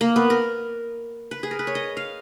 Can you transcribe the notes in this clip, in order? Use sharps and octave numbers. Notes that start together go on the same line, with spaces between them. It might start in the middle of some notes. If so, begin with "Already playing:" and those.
A#3
B3
A#4
B4
G#4
A#4
B4
C#5
D#5
F5